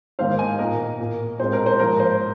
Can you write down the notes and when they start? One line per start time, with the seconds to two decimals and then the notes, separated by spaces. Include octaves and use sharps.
0.19 G#2 D#3 A#3 C5 F5
0.39 D#5 G#5
0.59 A#2 A#3 A#4 D#5
0.99 A#2 A#3
1.39 A#2 G#3 C4 C5
1.53 A#4
1.66 C5
1.80 G#2 F3 A#3 A#4
2.00 C5